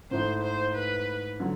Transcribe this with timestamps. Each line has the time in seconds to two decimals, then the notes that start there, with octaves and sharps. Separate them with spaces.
0.11 G#2 E3 A3 C5
0.42 C5
0.75 B4
1.40 D3 F#3